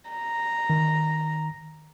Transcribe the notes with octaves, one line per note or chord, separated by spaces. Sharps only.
A#5
D#3